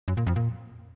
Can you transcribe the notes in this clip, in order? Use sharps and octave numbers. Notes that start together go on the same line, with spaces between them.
F#2
A#2
F2
A#2